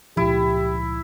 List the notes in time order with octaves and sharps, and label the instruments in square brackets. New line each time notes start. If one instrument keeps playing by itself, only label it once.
[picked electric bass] C#2 A#2 F3 [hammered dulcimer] E4 [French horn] G4